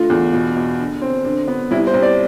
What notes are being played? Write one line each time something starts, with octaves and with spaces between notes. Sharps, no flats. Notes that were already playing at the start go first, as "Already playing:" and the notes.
Already playing: D3 A3 F4
E2
B2
B2
D3
C4
D3
B3
C2 E4
C5
C2
D5